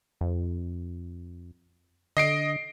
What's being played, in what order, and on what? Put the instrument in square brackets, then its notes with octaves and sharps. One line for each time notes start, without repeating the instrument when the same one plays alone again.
[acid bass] F2
[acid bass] D3 [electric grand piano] D#5 C7 D7